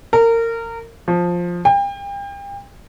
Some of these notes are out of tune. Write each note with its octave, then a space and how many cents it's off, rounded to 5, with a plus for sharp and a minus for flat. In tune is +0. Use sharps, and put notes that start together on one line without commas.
A#4 -25
F3 +5
G5 +35